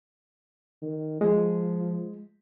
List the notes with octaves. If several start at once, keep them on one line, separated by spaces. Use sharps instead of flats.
D#3
F3 G#3